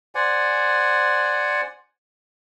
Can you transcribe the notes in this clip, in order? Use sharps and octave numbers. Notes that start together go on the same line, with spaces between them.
C5 D5 F#5 G#5